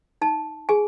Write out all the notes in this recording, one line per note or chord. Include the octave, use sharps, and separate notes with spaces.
D#4 A5
G#4 G#5